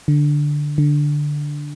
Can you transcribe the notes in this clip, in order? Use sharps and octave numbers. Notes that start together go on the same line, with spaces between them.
D3
D3